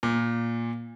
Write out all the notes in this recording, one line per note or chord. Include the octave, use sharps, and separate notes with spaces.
A#2